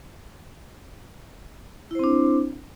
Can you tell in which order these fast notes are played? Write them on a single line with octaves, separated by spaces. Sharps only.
E4 C5 C4 D4